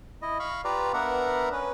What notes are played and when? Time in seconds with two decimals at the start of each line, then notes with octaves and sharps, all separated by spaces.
0.22 E4 D#5
0.39 F5 B5 C#6
0.64 F4 G4 B4 D5 A#5
0.94 B3 D4 A#4 E5 F#5 A#5
1.52 C#4 B4